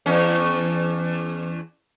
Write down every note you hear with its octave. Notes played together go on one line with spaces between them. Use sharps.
E2 C#4